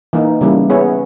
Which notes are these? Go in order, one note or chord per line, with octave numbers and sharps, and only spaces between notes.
E3 A#3 D#4
C#3 E3 G3 A#3 E4
B3 E4 G#4 C#5